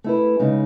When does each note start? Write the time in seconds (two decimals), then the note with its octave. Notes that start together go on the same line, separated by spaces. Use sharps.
0.04 A3 E4 B4
0.40 C#3 G#3 D#4